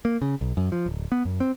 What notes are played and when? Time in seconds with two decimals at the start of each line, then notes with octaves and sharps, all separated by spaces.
0.05 A#3
0.22 C#3
0.41 B1
0.57 F#2
0.72 F3
0.86 D1
1.12 B3
1.25 F#2
1.40 C4